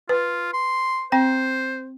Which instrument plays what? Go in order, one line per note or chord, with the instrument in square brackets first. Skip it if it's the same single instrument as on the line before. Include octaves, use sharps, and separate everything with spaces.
[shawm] F4 [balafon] B4
[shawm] C6
[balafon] C4 G5 [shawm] C5